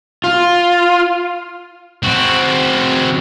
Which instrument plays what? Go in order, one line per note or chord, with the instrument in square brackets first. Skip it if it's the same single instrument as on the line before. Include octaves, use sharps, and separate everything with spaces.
[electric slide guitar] F4
[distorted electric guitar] C4 F#4